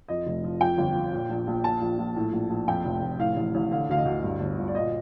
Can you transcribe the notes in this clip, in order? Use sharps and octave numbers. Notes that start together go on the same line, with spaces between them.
F2 D#5
F1
F3
F2 G5
G1
F3
A#2
A#1
A#1
A#2 A5
A#1
A#1
A2
A#1
A#1
F2 G5
F1
F1
A2 F5
A1
A1
D3 F5
D2 F5
D#5
D2
G2
G1
G1
D5
A#2 D#5